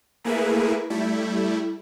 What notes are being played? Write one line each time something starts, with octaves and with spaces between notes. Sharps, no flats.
A3 A#3 E4 G#4 A#4 B4
G3 A3 E4